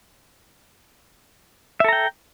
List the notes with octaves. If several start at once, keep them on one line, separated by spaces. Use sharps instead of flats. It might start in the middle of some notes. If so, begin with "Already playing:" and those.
A4 E5 G5 A#5